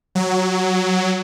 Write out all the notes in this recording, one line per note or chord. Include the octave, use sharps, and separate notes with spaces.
F#3